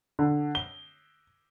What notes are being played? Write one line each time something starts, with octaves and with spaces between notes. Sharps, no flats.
D3
G7